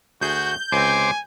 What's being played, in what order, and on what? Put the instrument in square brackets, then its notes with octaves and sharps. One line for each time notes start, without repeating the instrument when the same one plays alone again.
[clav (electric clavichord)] D2 G#4 [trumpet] F#4 [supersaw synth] G6
[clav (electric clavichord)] C#2 C4 [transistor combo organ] C5 D6 [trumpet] G#5